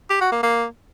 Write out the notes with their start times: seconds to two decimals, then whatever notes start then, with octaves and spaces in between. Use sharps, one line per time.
0.10 G4
0.21 F#4
0.32 A#3
0.43 A#3